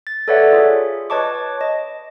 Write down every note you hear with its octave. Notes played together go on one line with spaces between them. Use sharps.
A6
A4 B4 C#5 D5 E5 F#5
F4 G#4
B4 C#5 D#5 A5 C#6 D6
D#5